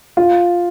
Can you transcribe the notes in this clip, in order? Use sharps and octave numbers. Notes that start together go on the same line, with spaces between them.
F4